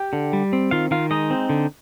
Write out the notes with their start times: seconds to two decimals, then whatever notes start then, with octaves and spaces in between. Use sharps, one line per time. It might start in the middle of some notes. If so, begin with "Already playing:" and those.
Already playing: G4 G5
0.13 D3
0.33 G3
0.53 C4
0.71 D#3 F4 F5
0.91 D#3 F4 F5
1.11 G#3 D#4 D#5
1.30 C4
1.49 D3